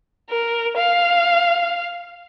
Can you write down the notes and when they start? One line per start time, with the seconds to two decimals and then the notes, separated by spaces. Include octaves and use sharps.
0.30 A#4
0.77 F5